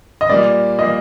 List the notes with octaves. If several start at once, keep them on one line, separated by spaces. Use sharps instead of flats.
D#5
A#2 G3 A#3 D5
A#2 G3 A#3 D#5